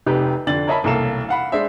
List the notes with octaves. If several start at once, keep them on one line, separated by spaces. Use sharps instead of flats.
F1 C3 D#4 G4 B4
F2 D3 D4 A6 F#7
A#4 C#5 D#5 E5 A5 B5
E1 C2 A#3 A4 F5 E7
F5 F#5 B5
G#3 D4 C5 E5